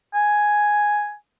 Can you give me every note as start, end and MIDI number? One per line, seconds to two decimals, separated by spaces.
0.14 1.14 80